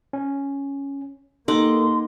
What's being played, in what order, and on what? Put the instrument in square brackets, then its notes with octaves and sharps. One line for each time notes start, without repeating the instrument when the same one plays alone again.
[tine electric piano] C#4
[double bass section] A#3 [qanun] D#4 F#5 D6 [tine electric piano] G4 A4 [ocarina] C6